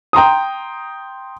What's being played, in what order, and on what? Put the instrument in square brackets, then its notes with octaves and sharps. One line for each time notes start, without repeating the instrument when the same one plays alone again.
[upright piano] G5 A#5 C6 D#6